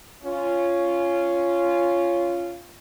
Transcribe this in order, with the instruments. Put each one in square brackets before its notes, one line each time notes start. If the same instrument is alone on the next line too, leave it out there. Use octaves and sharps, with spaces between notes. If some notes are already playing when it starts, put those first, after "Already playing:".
[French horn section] C#4 F4